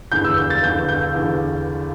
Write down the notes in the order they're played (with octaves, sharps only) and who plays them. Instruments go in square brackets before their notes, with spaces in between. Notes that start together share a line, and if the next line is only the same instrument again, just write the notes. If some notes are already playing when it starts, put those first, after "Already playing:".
[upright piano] E2 D3 G6
E6
G6
A6
E2 D3 G6
G6
E2 D3